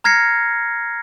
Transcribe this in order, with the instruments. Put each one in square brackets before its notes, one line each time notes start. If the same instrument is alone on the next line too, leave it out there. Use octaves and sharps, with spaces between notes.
[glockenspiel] A#5 F6 G#6 A#6 C7 C#7